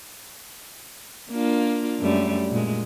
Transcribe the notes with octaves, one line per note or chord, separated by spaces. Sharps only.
A#3 D4 F4
F#2 G3 A3
A#2 G#3